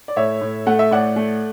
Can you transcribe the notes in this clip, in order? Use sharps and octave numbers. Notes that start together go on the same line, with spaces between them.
D5
A2 C#5 E5
A2
A3 F#5
E5
A2 D5 F#5
A3